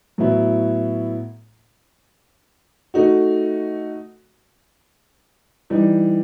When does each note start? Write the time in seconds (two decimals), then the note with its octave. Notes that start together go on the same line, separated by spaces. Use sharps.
0.18 A2 F#3 B3 E4
2.94 A3 D#4 F#4
5.70 E3 G3 D#4